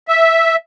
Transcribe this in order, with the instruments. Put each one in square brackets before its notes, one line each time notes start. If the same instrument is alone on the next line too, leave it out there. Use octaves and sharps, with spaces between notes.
[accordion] E5